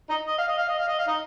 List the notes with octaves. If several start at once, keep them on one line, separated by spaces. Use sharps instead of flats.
D#4 D#5
D#5
F5
D#5
F5
D#5
F5
D#5
F5
D#4 D#5